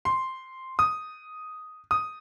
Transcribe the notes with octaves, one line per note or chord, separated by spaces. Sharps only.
C6
D#6
D#6